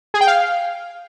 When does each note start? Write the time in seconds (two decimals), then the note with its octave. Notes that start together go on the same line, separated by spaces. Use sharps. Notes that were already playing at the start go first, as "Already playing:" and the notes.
0.14 G#4
0.21 G5
0.27 F5